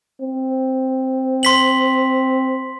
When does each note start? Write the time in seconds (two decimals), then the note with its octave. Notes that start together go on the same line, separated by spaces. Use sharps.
0.21 C4
1.43 C6 B6 F#7